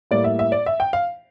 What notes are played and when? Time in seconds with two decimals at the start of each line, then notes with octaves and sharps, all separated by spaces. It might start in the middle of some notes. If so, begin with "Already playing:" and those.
0.11 A2 G3 A#3 E4 D5
0.24 E5
0.39 E5
0.52 D5
0.66 E5
0.80 G5
0.93 F5